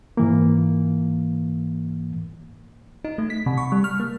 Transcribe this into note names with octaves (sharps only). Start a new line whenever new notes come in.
G#2 E3 A#3
D#4
A3
B6
C3
C#6
G3
F6
A#3